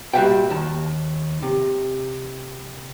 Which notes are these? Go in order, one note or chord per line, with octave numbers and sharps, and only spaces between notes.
A#2 G3 F#4 E5 F5 G5
D#2 A5
C3